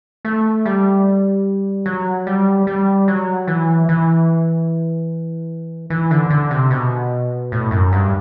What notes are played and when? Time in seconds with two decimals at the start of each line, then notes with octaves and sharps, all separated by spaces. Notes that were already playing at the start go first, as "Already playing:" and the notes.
0.25 A3
0.65 G3
1.86 F#3
2.27 G3
2.67 G3
3.08 F#3
3.47 E3
3.89 E3
5.90 E3
6.11 D3
6.30 D3
6.51 C3
6.71 B2
7.52 A2
7.71 F#2
7.93 G2